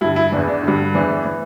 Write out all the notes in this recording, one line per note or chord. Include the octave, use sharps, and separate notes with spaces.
G2 D3 E4
E4
E2 E3 D4
D4
G2 D3
E2 E3 D4
E3